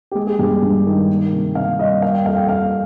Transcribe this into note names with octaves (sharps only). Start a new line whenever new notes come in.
G4
G#3 G#4
G#4
G2 G4
G2
D#3
A#3
C3
C3 F5
G3 D#5
A#3 F5
G5
F2 F5
G5
F2 F5